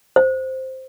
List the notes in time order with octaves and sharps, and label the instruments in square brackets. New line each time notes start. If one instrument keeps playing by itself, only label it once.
[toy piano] C5